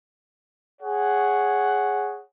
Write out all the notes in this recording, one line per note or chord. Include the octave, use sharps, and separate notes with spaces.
G#4 C#5 F#5